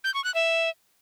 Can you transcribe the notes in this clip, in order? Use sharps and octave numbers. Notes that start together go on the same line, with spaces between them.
G6
C#6
F#6
E5